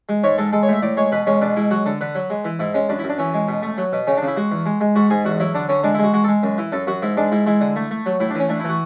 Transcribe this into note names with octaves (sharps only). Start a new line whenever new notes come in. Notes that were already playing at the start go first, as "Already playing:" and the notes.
G#3
G#2 C#5
G#3 A4
G#3 A4
C#5
A2 E5
A2 D5
G#3 C#5
B2 B4
G#3 C#4
B2 D4
G#3 E4
F#3 F#4
D3 A4
D3 B4
F#3
G#3
E3
G#2 E4
G#3 C#4
F#2 D4
E4
F#2
D4
E3 C#4
G#3
B2
A3
F#3
B2
C#3 C#4
D4
C#3
E4
G#3 F#4
E2
G#3
G#3
G#2 F#4
G#2 G#4
E2 F#4
F#3 E4
D3 D4
D3 C#4
G#3 D4
E4
G#3 F#4
G#3 F#4
A4
G#3
F#2
E3
F#2 A4
F#2 F#4
G#2 E4
G#3 D4
G#2 E4
G#3 E4
D3
A3
A3
F#3
A2 E4
D4
E3 C#4
A3 D4
E4
E3 F#4